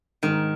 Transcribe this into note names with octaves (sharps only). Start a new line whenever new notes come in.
G#2 D#3